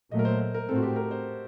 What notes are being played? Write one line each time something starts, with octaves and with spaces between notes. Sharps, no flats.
A#2 F#3 A3 D#5
A#4
C5
C5
A#4
A2 A3 C4 A4
F#4
G4
A#4
C5